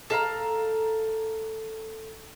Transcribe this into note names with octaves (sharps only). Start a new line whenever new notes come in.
A4 F5 A#5